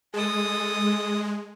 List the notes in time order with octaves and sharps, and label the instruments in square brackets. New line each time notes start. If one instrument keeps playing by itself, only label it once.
[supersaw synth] G#3 [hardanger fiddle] A4 D#6